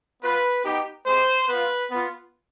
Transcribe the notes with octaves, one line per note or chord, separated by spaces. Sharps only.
B3 F4 B4
B3 D#4 G4
G#3 C4 G4 C5
B3 F4 B4
B3
F4